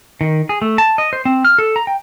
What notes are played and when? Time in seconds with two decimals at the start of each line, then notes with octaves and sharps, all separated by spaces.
0.21 D#3
0.49 G#4
0.62 A3
0.78 A5
0.98 D#5
1.13 C5
1.25 C4
1.45 F6
1.59 A4
1.76 A#5
1.87 G5